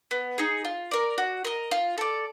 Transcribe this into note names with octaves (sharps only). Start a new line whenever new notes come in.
B3
D#4 G#4
F4
A#4 D5
F#4
A#4 D#5
F4
A4 D5